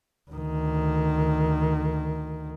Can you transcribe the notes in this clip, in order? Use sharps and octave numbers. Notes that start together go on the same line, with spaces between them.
D2 D#3